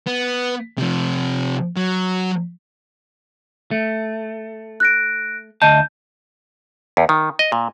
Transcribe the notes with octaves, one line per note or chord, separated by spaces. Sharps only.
B3
C3 F3
F#3
A3
F#6 A#6 D7
D2 D#5 A5 G6
E2
D#3
D#5
A#2